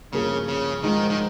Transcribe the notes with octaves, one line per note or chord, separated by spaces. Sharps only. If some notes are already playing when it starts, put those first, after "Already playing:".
G2 C#3 F3 A#3 F4 G#4
C#3
G#2 D#3 F3 G#3 D#4
D#3